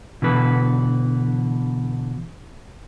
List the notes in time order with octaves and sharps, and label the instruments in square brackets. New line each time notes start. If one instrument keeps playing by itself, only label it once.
[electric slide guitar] B2 D3 E3 B4